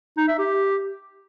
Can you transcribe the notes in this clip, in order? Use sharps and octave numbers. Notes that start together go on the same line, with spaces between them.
D#4
E5
G4